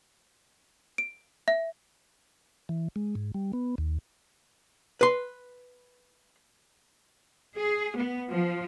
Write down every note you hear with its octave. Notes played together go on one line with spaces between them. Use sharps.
D7
E5
E3
G#3
G#2
G3
B3
D#2
B4 C6
G#4
B3
F3